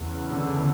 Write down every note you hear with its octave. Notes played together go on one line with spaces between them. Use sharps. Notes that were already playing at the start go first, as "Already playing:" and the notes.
Already playing: E2 C#3
D3